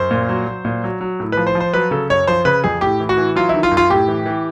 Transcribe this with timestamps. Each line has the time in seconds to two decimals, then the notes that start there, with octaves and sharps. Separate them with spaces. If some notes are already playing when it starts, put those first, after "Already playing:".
Already playing: F#2 C5
0.11 A#2
0.29 F#3
0.47 F#3
0.65 A#2
0.84 F#3
1.01 F#3
1.20 A2
1.32 B4
1.37 F3
1.47 C5
1.55 F3
1.60 C5
1.74 F#3 B4
1.91 C#3 A4
2.10 F#2 C#5
2.27 F3 C5
2.45 C#3 B4
2.64 F2 G#4
2.81 A2 G4
3.00 E3
3.09 F#4
3.17 E3
3.36 F#3 F4
3.49 E4
3.54 D#3
3.63 F4
3.71 F#2
3.77 F4
3.90 A2 G4
4.08 E3
4.26 E3